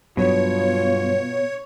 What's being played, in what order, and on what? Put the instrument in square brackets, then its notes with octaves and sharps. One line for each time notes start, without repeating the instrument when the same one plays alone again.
[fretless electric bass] G2 F#3 [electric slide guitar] B2 [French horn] F4 [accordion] C#5